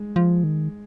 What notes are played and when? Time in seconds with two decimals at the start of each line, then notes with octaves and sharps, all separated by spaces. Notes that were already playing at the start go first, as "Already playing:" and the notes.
Already playing: G#3
0.16 F3
0.44 D#3